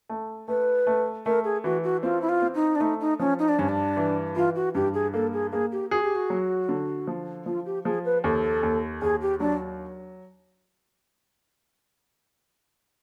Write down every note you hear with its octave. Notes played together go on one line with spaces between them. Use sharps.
A3
A3 B4
A3
A3 A#4
G#4
E3 F#4
F#4
C4 F4
E4
F4
C4
D#4
D4
A3 D#4
D#4
F3 C#4
D#4
D4
G2 C#4
D4
E3
E3 F4
F#4
G2 G4
G#4
A#3 A4
G#4
A#3 G#4
G4
F#4 G#4
G4
F#4
F#3
D3
F3
F3 F4
G4
F3 G#4
B4
D#2 A4
D#2
D#2 G#4
G4
F#3 D4